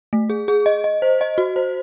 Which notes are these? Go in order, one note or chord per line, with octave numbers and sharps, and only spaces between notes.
A3
G#4
G#4
D#5
D#5
C5
D#5
F#4
C5